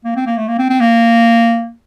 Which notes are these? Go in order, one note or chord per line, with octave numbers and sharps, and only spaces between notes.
A#3
C4
A#3
A3
A#3
C4
C4
A#3